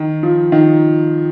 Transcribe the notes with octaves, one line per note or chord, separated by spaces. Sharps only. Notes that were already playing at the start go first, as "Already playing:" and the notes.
Already playing: D#3
F3
D#3